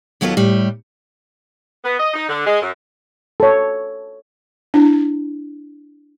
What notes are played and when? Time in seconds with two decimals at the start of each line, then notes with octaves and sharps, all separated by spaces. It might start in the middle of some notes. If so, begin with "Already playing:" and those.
0.21 D#2 F#3 B3 F4 A4 D#5
0.37 A2 G3
1.84 B3
1.99 D#5
2.14 D#4
2.29 D3
2.46 G#3
2.61 F#2
3.40 A4 C#5
4.74 D4 E4